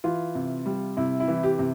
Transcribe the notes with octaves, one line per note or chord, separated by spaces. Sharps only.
E3 F4
C3
G3
C3 E4
E4
E3
G4
C3